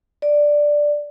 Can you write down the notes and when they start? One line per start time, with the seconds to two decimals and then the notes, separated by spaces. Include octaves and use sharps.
0.22 D5